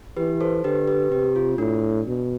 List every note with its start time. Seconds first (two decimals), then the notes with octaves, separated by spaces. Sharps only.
0.17 E3 G4 B4
0.41 A4 C5
0.64 D3 G4 B4
0.87 G4 B4
1.11 C3 G4
1.36 F4
1.58 A2 D4
2.07 B2